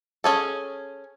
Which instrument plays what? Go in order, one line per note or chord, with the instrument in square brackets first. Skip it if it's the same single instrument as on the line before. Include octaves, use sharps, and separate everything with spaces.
[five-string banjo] C#4 G#4 A4